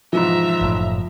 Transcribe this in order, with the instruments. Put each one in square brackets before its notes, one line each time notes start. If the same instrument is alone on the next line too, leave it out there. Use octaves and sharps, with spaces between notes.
[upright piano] G#2 B2 E3 [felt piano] F3 [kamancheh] E5 A#5
[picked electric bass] F#1 A2